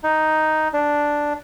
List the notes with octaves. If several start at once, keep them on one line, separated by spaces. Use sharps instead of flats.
D#4
D4